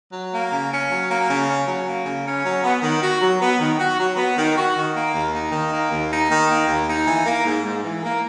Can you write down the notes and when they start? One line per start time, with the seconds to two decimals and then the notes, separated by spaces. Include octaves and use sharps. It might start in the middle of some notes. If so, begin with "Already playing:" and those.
0.13 F#3
0.32 A#3
0.51 C#3
0.71 C#4
0.90 F#3
1.09 A#3
1.28 C#3
1.48 C#4
1.67 F#3
1.86 A#3
2.05 C#3
2.24 C#4
2.44 F#3
2.63 B3
2.82 D#3
3.02 F#4
3.21 F#3
3.41 B3
3.60 D#3
3.79 F#4
3.98 F#3
4.17 B3
4.37 D#3
4.56 F#4
4.75 D#3
4.94 A#3
5.14 D#2
5.33 D#4
5.52 D#3
5.72 A#3
5.91 D#2
6.10 D#4
6.30 D#3
6.48 A#3
6.68 D#2
6.88 D#4
7.07 E3
7.26 A#3
7.45 G#2
7.64 G#2
7.84 E3
8.03 A#3